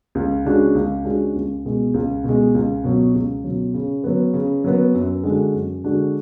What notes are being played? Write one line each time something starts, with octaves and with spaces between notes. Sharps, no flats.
C#2
C#3 G#3 D4 F#4
C#2
C#3 G#3 D4 F#4
C#2
B2 G#3
C#2
B2 G#3
C#2
B2 F#3
C#2
B2 F#3
C#3
F#3 B3
C#3
F#3 B3
F#2
D3 G#3 D4 F#4
F#2
D3 G#3 D4 F#4